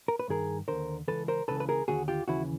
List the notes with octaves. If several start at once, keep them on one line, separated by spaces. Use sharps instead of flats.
A#4
B4
G2 D#3 G#4 A#4
D#2 D3 A#4 C5
C#2 C#3 E3 A4 B4
A#4 C5
C#2 C#3 E3 A4 B4
B4
G#4 A#4
D#2 D3 F#4 G#4
F4 G4
D#2 C#3 E3 E4 F#4